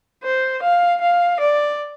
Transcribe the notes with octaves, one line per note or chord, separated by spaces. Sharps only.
C5
F5
F5
D5